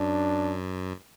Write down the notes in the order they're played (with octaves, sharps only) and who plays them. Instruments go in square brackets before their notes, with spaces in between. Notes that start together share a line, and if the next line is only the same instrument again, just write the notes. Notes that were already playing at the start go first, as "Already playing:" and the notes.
Already playing: [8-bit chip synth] F#2 [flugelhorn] D4